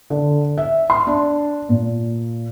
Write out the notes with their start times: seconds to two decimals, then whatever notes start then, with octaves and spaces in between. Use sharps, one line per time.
0.10 D3
0.58 E5
0.90 C6
1.07 D4
1.69 A#2